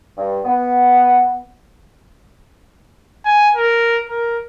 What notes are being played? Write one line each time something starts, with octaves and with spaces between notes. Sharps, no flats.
G2
B3
G#5
A#4
A#4